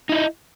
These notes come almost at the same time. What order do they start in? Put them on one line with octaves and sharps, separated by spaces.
D#4 E4 D#5